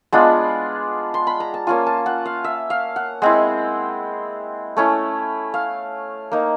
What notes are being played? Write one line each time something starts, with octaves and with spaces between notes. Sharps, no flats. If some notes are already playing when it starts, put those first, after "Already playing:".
G#3 B3 D4 F4 F#5
C6
B5
A#5
A5
A#3 C#4 F4 G#5
A5
F#5
F5
E5
F5
F#5
G#3 C4 E4 F#5
A3 C#4 E4
F5
A#3 D#4